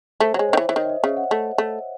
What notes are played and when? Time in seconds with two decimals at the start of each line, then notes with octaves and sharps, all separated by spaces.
0.20 A3 C5
0.34 F#3 G#3 C#5
0.49 C5
0.53 D#3
0.57 E3
0.62 C5
0.69 E3
0.76 D#3
0.84 E5
0.89 D#5
1.04 C#3 E5
1.17 F#5
1.31 A3
1.58 A3